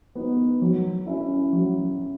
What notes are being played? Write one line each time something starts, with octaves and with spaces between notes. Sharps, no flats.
B3 D#4
F#3
C#4 E4
F#3